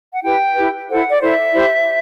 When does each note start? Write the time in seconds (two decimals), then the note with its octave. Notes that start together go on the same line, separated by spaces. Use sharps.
0.12 F#5
0.22 E4 G4 B4 G5
0.55 E4 G4 B4
0.88 E4 A4 C5 F#5
1.10 D5
1.21 E4 A4 C5 E5
1.53 E4 G4 C5